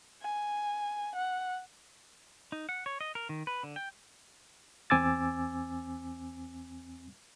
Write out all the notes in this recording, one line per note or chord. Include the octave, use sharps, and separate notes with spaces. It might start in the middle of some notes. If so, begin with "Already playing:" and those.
G#5
F#5
D#4
F#5
C#5
D#5
A#4
D#3
B4
D3
G5
E2 C4 G#5 D6 E6 A6